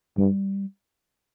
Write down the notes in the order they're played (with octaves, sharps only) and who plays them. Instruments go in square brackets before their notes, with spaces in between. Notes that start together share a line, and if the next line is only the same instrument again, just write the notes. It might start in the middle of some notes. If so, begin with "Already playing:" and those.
[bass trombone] G2 [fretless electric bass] G3